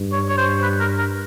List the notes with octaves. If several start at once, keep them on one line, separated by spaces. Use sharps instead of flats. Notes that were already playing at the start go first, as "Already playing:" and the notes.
Already playing: G2
C#5
C#5
C5
B4
A#4
A#4